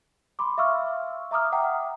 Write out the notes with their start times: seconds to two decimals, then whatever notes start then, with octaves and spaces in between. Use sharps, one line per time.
0.39 B5 C6 D6
0.58 E5 F5 C#6 E6 F6
1.31 E5 A#5 D6 D#6 F6
1.52 E5 F#5 G5 A#5